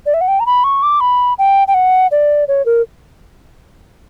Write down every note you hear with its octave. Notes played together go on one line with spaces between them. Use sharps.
D5
E5
F#5
G5
A#5
B5
C#6
D6
B5
G5
G5
F#5
D5
C#5
A#4